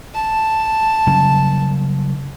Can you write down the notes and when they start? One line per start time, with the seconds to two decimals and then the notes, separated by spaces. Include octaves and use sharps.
0.14 A5
1.07 C#3 F#3 G3